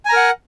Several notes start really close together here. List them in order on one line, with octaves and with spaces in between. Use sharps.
G#5 A#5 A#4 F#5